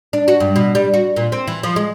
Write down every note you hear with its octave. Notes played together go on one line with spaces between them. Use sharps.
D4
F#4
G2
B2
G3
F#4
A#2
C4
E3
F3
G#3